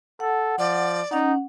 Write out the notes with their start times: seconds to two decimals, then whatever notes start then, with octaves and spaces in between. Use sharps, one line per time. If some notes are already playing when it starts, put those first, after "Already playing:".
0.20 A4 F#5
0.59 F3 D5
1.11 C#4 D#4 F#5